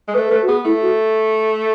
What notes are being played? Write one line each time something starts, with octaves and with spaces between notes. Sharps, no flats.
G#3
A3 B4
A4
A3 B4
F#4
B3 G#4
A3 E4
F#4